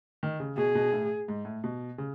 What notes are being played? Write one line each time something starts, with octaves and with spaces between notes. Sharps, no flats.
D#3
C#3
B2 G#4
B2
A2
G#2
A2
B2
C#3